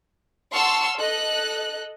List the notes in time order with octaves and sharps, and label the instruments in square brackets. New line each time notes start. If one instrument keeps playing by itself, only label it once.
[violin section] F#5 A5 C6 C#6 E6 F6
A4 D#5 F#6